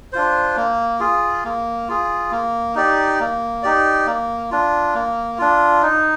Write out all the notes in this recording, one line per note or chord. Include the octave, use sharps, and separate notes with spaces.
D4 F4 C5
A#3
F4 G#4
A#3
F4 G#4
A#3
D#4 G4 D5
A#3
D#4 G4 D5
A#3
D4 F4
A#3
D4 F4
D#4